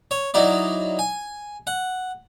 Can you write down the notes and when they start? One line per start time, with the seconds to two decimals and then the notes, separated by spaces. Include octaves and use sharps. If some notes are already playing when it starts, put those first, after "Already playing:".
0.11 C#5
0.34 F#3 D#4 E4 D5
0.99 G#5
1.67 F#5